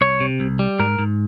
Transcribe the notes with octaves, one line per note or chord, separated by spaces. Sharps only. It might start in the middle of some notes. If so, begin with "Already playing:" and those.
C2 C#5
C3
C2
G3
G#2 A#4
G#2